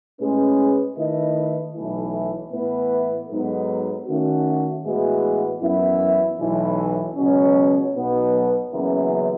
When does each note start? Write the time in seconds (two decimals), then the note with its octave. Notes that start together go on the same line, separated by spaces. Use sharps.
0.19 A2 G#3 C#4 G#4 B4
0.96 D#3 A3 E4 B4 D#5
1.75 B1 A2 E3 A3 E4
2.52 A2 E3 B3 E4 B4
3.29 G#2 F#3 B3 D#4 A4
4.06 D#3 A3 C#4 F#4
4.84 A2 E3 G#3 B3 F#4
5.61 F#2 E3 B3 E4
6.39 B1 A2 E3
7.16 C#2 B2 F#3 C#4
7.94 B1 B2 F#3 B3
8.71 F#1 F#2 C#3 E3 B3